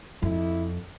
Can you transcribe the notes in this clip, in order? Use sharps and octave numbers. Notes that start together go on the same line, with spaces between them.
F2 E4